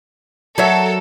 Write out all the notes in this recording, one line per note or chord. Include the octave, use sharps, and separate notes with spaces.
F#3 A4 A#4 C#5 E5